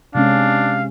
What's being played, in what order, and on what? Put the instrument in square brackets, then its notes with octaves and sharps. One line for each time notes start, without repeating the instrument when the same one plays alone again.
[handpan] C3 G#3 C#4 [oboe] D4 [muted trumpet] F5